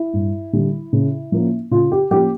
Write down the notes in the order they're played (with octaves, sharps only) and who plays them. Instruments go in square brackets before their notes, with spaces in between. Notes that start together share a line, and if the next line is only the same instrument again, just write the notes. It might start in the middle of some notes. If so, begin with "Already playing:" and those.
Already playing: [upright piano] E4
[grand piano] G2
D3 G3
C#3
F3 A#3 C#4
[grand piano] C#3 [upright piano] F4
[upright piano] G4
[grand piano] F3 A#3 C#4 [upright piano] G4